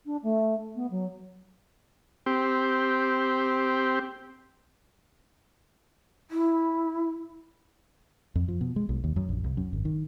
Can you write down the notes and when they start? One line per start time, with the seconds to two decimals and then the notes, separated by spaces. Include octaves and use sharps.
0.06 D4
0.23 A3
0.75 B3
0.91 F#3
2.26 C4 G4
6.31 E4
8.35 F2
8.48 F3
8.61 B2
8.76 G#3
8.89 B1
9.04 D#2
9.16 F#2
9.29 A#1
9.44 C2
9.57 F#2
9.73 G#1
9.85 D#3